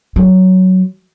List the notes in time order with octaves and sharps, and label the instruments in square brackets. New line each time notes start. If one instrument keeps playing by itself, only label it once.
[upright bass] F#3